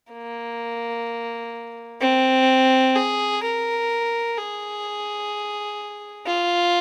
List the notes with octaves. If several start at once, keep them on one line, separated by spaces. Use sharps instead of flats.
A#3
C4
G#4
A#4
G#4
F4